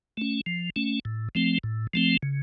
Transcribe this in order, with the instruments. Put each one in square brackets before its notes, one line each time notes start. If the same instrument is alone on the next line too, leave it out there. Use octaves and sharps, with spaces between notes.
[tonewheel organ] A3 C#4
F3
A3 C#4
A2
F3 A3 C4
A2
F3 A3 C4
C#3